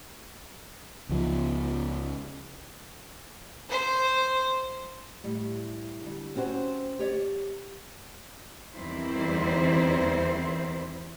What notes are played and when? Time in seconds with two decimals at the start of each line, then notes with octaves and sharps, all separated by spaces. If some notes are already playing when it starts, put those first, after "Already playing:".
1.09 C#2 F3
3.69 C5
5.24 A2 G3
6.02 D3 G3
6.36 C4 C#4 F#4 A#4 C5
6.99 G4 C#5 D5
8.75 E2 D#3 G3 C4 E4 C5